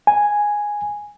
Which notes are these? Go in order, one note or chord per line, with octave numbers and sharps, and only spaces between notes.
G#5